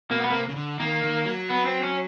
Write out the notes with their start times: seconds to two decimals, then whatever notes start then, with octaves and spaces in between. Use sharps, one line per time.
0.11 B2 A#3
0.20 B3
0.30 C3 A#3
0.49 C#3
0.56 D3
0.80 D#3 A#3
1.03 D#3
1.25 F#3
1.50 B3
1.66 C4
1.83 C#4